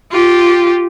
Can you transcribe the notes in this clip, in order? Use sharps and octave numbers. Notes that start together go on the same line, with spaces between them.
F4 G4